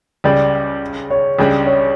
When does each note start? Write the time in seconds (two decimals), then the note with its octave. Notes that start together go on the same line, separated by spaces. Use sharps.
0.24 C#2 C#3 G3 D5
1.11 C#5
1.39 C#2 C#3 G3 D4
1.66 C#5